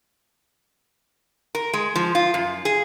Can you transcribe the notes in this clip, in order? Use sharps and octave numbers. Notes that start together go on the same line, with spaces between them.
A#4
G#3
F3
F4
F#2
G#4